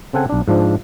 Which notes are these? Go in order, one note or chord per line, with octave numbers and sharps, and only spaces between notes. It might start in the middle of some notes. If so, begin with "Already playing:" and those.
C#3 C4 A4 F#5 G#5
B1 D4
G#2 F3 D4